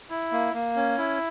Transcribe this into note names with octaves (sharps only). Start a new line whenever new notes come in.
E4
A#3
A#3
C#4
E4